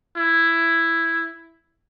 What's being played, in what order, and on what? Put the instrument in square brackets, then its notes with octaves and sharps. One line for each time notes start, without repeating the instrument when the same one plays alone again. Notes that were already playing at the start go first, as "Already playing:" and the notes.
[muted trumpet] E4